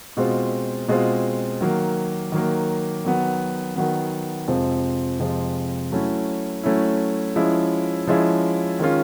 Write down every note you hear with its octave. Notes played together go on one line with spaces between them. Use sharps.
B2 G#3 C4 F4
B2 G#3 C4 F4
D#3 F#3 A#3
D#3 F#3 A#3
D#3 F#3 B3
D#3 F#3 B3
F2 C3 F3 G#3 C4
F2 C3 F3 G#3 C4
F#3 A3 C#4 E4
F#3 A3 C#4 E4
F3 G#3 C#4 E4
F3 G#3 C#4 E4
D#3 G#3 C#4 F4